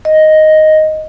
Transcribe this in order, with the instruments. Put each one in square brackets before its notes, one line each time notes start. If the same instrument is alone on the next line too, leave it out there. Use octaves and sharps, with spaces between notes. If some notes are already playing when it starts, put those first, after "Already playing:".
[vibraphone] D#5